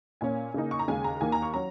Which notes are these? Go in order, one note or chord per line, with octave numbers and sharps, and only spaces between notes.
A#2 A#3 C#4 G#5
C#3 A#3 D#4
C#6
A#5
D#2 C#3 G#3 G#5
A#5
D#2 D#3 A#3 G#5
A#5
C#6
F#3 C#4 A#5